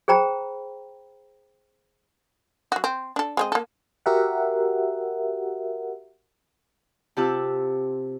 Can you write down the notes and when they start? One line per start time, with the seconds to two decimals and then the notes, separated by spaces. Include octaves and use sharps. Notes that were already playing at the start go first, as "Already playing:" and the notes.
0.08 G#4 C5 G5 A#5 B5
2.72 F#3 F#4
2.84 C4
3.16 D4 A4
3.37 G#3 C4 D#5
3.52 A#3 A4
4.06 F#4 G4 A#4 E5 F#5
7.17 C3 F4 G4 A5 E6 F#6